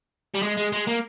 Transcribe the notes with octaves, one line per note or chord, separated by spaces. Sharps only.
G3
G#3
G#3
G#3
A#3